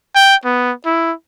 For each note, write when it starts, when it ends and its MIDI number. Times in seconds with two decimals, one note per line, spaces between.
0.15 0.36 79
0.45 0.72 59
0.86 1.12 64